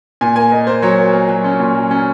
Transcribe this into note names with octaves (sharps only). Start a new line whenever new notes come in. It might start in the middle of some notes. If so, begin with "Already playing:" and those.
A#2 G#5
A#3 G#5
A#3 D#5
A#3 C5
F#3 C#5
A#3
A#3
F#3
C#4
A#2
F#3
C#4